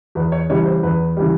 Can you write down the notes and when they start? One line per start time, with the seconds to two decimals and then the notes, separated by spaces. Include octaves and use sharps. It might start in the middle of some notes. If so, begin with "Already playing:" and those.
0.15 E2 B4
0.32 C#5
0.50 C#3 E3 G3 C#5
0.66 C5
0.83 E2 B4
1.16 C#3 E3 G3